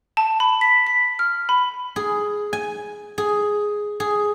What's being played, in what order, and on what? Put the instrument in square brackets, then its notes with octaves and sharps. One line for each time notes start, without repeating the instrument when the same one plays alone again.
[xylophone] A5
B5
B6
B6
F6
B5
[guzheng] G#4
G#5
G#4
G#4